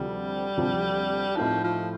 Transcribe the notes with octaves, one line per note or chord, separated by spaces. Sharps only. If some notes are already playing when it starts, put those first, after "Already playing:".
Already playing: D2 C3 F3 G3 C4
D2 C3 F3 C4
A2 F3 A3 C4 D#4
F3